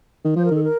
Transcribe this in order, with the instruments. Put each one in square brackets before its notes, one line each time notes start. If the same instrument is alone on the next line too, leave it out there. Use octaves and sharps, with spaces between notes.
[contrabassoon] D#3
[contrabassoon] F3 [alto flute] C5
[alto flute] A#4
[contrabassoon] D#3 [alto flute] A4
[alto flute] A#4